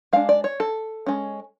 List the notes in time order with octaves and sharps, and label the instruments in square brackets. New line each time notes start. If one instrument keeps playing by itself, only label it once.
[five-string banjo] G#3 D4 F5
D5
C#5
A4
G#3 C#4